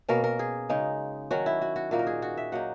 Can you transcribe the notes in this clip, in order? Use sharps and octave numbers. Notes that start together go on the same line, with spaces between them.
B2 A#3 C#4 A#4
A#4
G#4
C#3 G#3 D#4
D#3 F#3 C#4 F#4
E4
F#4
F#4
A#2 A#3 D#4 F#4
A#4
G#4
F#4
E5
F#3 A#3 D#4 F#5